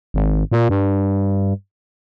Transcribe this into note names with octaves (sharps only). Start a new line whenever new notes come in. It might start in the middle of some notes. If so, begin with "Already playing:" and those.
G#1
A#2
G2